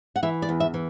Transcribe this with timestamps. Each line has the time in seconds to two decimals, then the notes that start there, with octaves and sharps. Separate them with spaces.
0.16 F#5
0.23 E3 E5
0.42 D5
0.49 E2
0.60 E5
0.74 E3